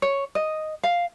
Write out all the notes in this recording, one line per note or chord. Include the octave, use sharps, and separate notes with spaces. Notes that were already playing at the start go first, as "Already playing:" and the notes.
C#5
D#5
F5